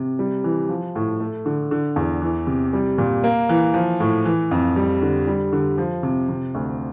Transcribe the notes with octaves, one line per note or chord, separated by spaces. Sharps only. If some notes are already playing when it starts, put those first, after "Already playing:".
Already playing: C3
G3
E3
F3
A2
A3
D3
D3
E2
E3
C3
G3
A#2
A#3
E3
F3
A2
E3
F2
G3
D3
G3
D3
F3
C3
C3
D2